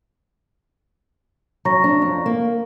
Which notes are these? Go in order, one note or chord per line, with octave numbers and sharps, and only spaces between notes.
F#3 A#5 C#6 A#6
D4
F2
A#3